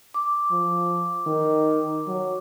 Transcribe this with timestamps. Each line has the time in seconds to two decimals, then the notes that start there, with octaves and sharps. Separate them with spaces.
0.14 D6
0.51 F3
1.27 D#3
2.07 F#3